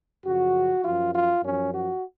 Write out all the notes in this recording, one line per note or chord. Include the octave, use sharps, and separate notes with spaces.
F#2 C#3 F3 F#4
F#2 F3 F4
F4
F#2 F3 C#4
F#4